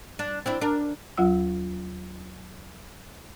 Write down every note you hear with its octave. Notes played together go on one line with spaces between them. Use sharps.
D4
C4 D4 E4
D4 A#4
D#2 F#3 F4 F#5 E6